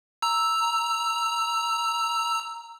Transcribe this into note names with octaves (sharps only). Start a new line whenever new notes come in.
A#5 E6